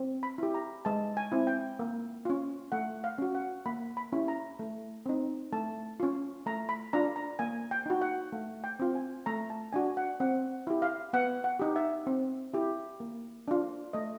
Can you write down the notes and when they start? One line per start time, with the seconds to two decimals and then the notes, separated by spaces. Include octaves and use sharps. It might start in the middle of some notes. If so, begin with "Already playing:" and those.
Already playing: C4
0.23 B5
0.38 E4 G4
0.54 A#5
0.85 G#3 A5
1.17 G#5
1.32 C4 E4
1.47 G5
1.79 A#3
2.25 C#4 F4
2.72 A3 F#5
3.04 F5
3.18 C#4 F#4
3.35 F#5
3.66 A#3 B5
3.97 B5
4.13 C#4 E4 G4
4.28 A#5
4.59 A3
5.06 C4 D#4
5.52 A3 A5
6.00 C#4 F4
6.46 A3 A#5
6.69 B5
6.93 D4 F4 A#5
7.16 A#5
7.39 A#3 G#5
7.71 G5
7.86 D#4 F#4
8.02 F#5
8.32 A3 F5
8.64 G5
8.79 C4 F4
8.95 G#5
9.26 A3 A#5
9.50 A5
9.73 D4 F#4 G#5
9.97 F#5
10.20 C4 F#5
10.67 E4 G4
10.82 F5
11.13 B3 F#5
11.44 F#5
11.60 D#4 G4
11.76 E5
12.07 C4
12.54 E4 G4
13.00 A#3
13.48 D4 F4
13.93 A3 D#5